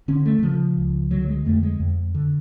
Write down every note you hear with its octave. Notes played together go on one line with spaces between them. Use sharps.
D3 C#4
A3
D3
C#3 F3
C#2
D3 F#3
G#3
F2 A3
G#3
F2
D3